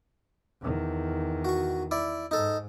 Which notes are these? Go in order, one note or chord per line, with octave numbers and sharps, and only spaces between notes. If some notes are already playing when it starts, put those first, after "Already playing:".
E2 D#3
F#4 C#6
E4 D5
G#2 D#4 A4